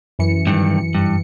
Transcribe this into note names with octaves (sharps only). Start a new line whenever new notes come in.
F#2 E3 C#7
G2 D#3
G2